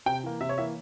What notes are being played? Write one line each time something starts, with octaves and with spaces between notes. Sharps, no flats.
C3 G5
E3 A#3
C3 E5
C#5
E3 A#3 E5